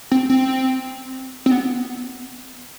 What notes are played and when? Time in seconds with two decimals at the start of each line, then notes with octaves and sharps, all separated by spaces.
0.12 C4
0.30 C4
1.46 C4
1.51 B3